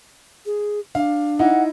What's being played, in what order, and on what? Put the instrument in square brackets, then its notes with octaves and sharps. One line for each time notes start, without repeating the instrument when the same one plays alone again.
[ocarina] G#4
[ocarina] D4 [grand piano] F5
[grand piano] D#4 E4 [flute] F#5